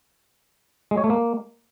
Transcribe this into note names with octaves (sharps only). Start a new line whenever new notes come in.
G#3
C#5
A3
A#3